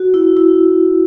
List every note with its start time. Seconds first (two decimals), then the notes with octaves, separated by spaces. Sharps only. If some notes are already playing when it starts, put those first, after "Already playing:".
Already playing: F#4
0.14 E4
0.37 E4